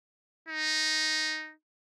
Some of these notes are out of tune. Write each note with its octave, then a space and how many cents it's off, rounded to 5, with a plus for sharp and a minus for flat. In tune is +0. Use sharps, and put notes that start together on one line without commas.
D#4 +0